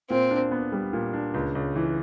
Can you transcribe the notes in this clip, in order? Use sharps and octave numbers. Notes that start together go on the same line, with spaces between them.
A#2 C4
D4
B3
G3
A#2
D4
C#2
C#2
E3